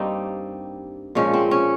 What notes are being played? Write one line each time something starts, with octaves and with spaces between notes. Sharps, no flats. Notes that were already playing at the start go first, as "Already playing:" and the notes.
Already playing: G2 G3 A#3 C4 D#4
A#2 F3 G#3 C#4
C4
C#4